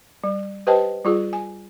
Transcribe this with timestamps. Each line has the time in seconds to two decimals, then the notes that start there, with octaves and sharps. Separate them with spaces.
0.24 G3
0.67 G4 B4 C5 D#5 G5 A5
1.05 G3 F4 G#4
1.33 G#5